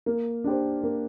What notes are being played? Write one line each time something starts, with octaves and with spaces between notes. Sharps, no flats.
A#3
D4 G4 C5
A#3